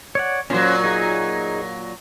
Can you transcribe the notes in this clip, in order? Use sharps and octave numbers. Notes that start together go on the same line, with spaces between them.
C#5 D5 F#5
A#2 F#3 C#4 C5
D#4 G#4